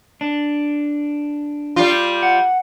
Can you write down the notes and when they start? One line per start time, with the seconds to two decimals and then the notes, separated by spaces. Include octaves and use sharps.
0.21 D4
1.76 G3 F4
2.23 F#5